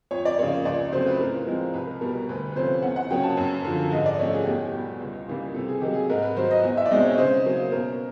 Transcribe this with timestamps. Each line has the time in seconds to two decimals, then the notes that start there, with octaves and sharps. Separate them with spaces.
0.11 F2 C#5
0.25 D5
0.38 C#3 F3 A#3 C#5
0.65 C#2 D5
0.92 C#3 F#3 A3 C4 C5
1.06 B4
1.20 A2 A#4
1.46 F3 G#3 C4
1.74 C2 B4
1.87 A#4
2.01 B2 G3 A#4
2.16 A#4
2.29 D2 B4
2.52 B4
2.56 C3 F3 A3 C#4 C5
2.82 E2 F#5
2.96 F#5
3.10 C#3 F#3 A#3 C#4 G5
3.24 A5
3.37 F#2
3.65 D3 F3
3.91 G#2 D#5
4.06 D5
4.19 F3 A3 C#4 C#5
4.33 G#4
4.44 E2 G4
4.65 G4
4.74 B2 G3
5.00 C#2
5.28 C#3 E3 G3 A#3
5.55 C3 A4
5.68 G#4
5.81 D#3 F#3 A#3 G4
5.93 G#4
6.10 G#2 A#4
6.22 B4
6.36 D#3 F#3 C5
6.51 D#5
6.64 E2
6.77 E5
6.85 D5
6.91 B2 G#3 C4 D#4 D#5
7.04 C#5
7.18 C#3 C5
7.45 F#3 A#3 C#4
7.72 B2 A#4